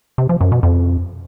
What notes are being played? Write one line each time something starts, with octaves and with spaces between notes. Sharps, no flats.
C3
F3
F#2
B2
F2